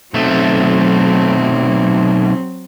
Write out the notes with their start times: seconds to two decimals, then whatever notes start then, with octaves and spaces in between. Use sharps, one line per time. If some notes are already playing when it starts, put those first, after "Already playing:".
0.14 B1 F#3 A3 C4